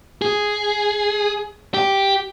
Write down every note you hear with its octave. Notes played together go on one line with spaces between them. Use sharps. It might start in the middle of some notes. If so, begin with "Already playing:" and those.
G#4
G4